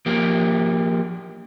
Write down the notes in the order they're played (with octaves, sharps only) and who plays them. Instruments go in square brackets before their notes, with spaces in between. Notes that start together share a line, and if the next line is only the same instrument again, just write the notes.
[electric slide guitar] F3 A#3 G4